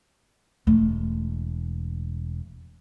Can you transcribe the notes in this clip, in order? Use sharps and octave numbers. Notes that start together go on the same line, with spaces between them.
E1 A3